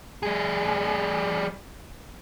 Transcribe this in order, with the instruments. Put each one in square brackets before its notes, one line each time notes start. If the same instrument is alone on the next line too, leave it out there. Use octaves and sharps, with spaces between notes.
[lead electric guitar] G3 G#4